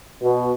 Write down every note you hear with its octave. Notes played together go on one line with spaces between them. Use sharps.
B2